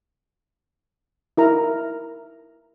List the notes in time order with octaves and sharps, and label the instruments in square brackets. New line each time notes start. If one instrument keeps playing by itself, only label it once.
[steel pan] E4 A#4 A#5